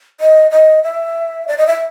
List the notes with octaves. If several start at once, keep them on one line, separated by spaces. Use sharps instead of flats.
D#5
D#5
E5
D5
D#5
E5